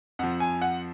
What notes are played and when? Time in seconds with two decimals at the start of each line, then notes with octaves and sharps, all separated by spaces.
0.19 F2 F3 F#5
0.40 G#5
0.62 F#5